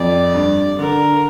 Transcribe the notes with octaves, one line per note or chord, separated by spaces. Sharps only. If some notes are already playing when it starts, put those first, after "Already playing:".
Already playing: F2 D5
G2
D3 A#4